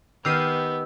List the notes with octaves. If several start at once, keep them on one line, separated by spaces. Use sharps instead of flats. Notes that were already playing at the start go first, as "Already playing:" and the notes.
D#3 B3 G4 E6 F6 C7 D#7